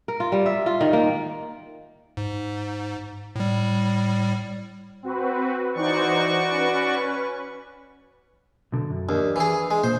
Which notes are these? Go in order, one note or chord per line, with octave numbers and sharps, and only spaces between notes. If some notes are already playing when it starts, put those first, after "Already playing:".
A#4
F4
G3
E5
F4
D#3
A#3
G#2
A2 G3
C4 F#4 B4
E3 D#4 F#4 C5 D5 C#6
C#4 B4
B1 D3
F#2
D#2 D4
E3 G#4
G#3
A#2 C5